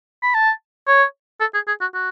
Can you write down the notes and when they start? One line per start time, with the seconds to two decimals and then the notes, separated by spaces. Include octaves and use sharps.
0.22 B5
0.34 A5
0.87 C#5
1.40 A4
1.54 G#4
1.67 G#4
1.81 F#4
1.94 F#4